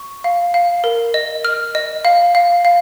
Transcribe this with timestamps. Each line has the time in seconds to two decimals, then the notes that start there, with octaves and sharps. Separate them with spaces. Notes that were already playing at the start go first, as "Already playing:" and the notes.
Already playing: C#6
0.24 F5
0.54 F5
0.84 A#4
1.14 D#5
1.45 F6
1.75 D#5
2.05 F5
2.35 F5
2.65 F5